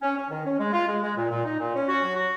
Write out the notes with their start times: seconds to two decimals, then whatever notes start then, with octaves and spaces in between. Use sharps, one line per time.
0.02 C#4
0.16 C#4
0.30 D#3
0.45 C#4
0.59 G#3
0.73 F4
0.88 G#3
1.02 G#3
1.17 A#2
1.30 A#2
1.44 D#4
1.59 A#2
1.74 C#4
1.88 F#4
2.02 F#3
2.16 F#4